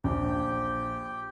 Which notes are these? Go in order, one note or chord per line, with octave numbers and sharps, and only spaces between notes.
A#1 G4 G5